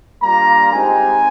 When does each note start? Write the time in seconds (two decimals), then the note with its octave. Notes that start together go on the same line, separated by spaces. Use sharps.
0.22 G3 A#3 D4 F4 A#5
0.72 G#3 C4 D#4 G4 G#5